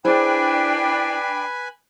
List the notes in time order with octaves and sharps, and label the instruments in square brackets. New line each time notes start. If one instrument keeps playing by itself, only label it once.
[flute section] D4 G5 [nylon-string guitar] E4 G#4 C5 [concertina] B4 G#5 B5